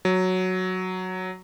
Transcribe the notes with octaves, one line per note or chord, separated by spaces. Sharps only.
F#3